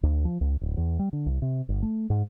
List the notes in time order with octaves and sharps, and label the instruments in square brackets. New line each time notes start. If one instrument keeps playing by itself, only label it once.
[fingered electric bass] D2
F3
C#2
D1
E2
G3
D3
C2
C3
G1
A3
G#2